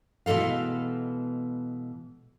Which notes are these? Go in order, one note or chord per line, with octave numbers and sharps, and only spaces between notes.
B2 E3 G#3 A4 F5